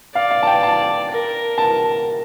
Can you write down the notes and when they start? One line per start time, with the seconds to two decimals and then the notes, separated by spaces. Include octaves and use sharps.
0.15 D5 F5
0.31 F5
0.43 A5
0.47 G5
0.63 A5
1.10 A#4
1.58 A5